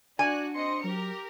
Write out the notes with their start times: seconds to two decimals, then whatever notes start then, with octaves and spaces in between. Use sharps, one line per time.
0.19 D4 F#4 D5 G#5 F#6
0.54 C4 D#5 C6 C#7
0.84 F#3 G4 A#4